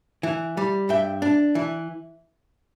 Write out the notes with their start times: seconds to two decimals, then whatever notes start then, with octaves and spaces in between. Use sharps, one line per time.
0.23 E3
0.57 G3
0.89 G2 E5 G5
1.22 D4
1.55 E3